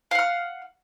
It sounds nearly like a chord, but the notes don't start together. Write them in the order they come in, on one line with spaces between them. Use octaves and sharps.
F5 F#5 F6